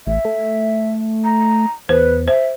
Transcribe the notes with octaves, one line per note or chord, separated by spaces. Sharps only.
A1 E5
A3
A#5
E2 B4 C5
C5 E5